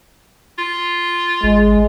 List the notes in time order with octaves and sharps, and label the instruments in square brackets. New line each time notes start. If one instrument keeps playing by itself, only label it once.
[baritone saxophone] F4
[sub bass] G#1 [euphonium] G#3